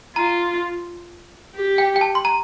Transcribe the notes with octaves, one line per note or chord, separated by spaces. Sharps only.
F4 A#5
G4
G5
G5
A5
C6
A#5